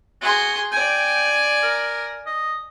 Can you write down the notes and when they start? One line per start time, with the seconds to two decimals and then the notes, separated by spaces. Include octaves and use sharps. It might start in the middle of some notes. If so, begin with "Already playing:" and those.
0.21 F#4 G#4 C6
0.72 D5 G5 G#5
1.63 A#4
2.26 D#5